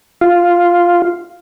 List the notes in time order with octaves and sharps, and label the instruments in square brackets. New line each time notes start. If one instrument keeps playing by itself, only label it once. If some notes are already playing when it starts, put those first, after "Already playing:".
[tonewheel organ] F4